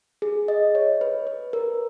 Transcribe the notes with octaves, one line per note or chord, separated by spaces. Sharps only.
G#4
D#5
C#5
B4
B4
A#4